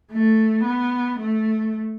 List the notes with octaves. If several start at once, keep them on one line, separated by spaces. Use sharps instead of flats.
A3
B3
A3